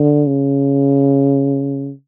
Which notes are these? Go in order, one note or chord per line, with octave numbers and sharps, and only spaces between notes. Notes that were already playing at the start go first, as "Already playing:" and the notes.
Already playing: D3
C#3